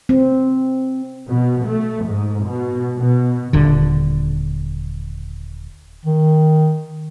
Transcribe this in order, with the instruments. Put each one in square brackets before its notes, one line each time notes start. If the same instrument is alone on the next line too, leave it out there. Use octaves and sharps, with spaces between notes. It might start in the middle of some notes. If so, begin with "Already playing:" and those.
[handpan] C4
[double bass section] B2
A3
G#2
B2
B2
[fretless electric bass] D#1 D3
[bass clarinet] D#3